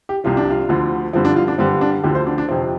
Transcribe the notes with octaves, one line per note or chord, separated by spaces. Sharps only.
G4
C2 C3 F3 F4
D4
F4
D2 D3 F3
G2 D3 F3 C4
D4
F4
D4
G2 D3 G3 C4
D4
D2 D3 F3 G4
C5
D4
D4
F2 C3 F3 C4